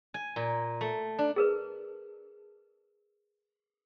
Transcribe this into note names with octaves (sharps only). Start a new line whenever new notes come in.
G#5
A#2
A3
D4
G#4 A#4 B4